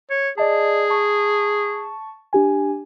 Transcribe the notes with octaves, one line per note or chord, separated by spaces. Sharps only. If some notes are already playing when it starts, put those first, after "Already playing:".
C#5
G#4 D5 D#5 A5
A5 C#6
D4 G4 G#5